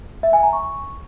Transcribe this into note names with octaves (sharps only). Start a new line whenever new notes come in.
E5
G#5
A#5
C#6